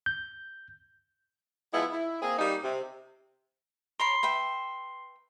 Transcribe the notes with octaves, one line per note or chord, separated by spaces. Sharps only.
G6
F3 G#3 B3 E4
E4
A#3 C4 G#4
G3 A#3 D#4
C3
A#4 C#5 B5 C6 C7
B4 E5 G5